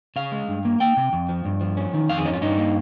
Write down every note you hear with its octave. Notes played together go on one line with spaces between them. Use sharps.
C#3 F5
G#3
G2
A#3
A#3 G5
C3
F2
F3
G2
F3
C#4
D#3
F2 F5
G#4
C#4 D#4
F4
G2 D#4
A#3